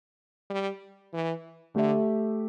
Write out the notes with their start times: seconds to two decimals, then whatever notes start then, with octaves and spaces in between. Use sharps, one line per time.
0.50 G3
1.13 E3
1.75 D3 A3 G4 E5